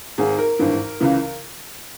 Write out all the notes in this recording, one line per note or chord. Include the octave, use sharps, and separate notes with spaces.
G#1 G#2 D#3 G#4
A#4
G#1 G2 E3
C#2 C#3 E3